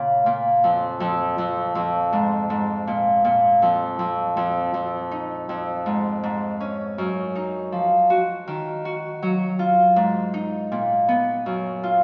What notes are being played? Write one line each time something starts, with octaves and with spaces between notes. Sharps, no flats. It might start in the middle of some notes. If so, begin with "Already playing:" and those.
Already playing: A#2 C#3
A#2
F2
F2
F2
F2
G#2
G#2
A#2
A#2
F2
F2
F2
F2
D#4
F2
G#2
G#2
C#4
F#2
D#4
F3
F#4
D#3
F#4
F#3
F4
G#2
D#4
A#2
B3
F#2
F4